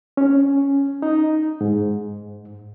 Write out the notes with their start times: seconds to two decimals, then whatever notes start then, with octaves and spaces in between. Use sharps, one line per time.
0.17 C#4
1.02 D#4
1.61 G#2